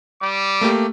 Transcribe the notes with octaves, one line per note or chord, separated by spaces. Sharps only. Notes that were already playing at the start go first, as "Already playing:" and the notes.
G3 D6
A3 A#3 G4